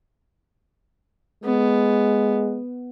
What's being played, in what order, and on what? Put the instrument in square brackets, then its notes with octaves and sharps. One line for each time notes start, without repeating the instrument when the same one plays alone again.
[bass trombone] G#3 [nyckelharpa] B3